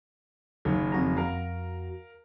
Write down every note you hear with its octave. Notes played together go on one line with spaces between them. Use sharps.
F#1 D#3 F#3
F2 F#4 A#5
A#4 F5